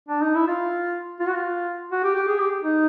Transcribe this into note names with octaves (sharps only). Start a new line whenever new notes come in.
D4
D#4
E4
F4
F4
F#4
F4
F#4
G4
G4
G#4
G4
D#4